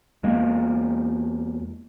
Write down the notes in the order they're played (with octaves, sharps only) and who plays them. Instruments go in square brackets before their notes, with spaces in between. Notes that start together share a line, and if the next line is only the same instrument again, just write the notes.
[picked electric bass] E2 G#3 A#3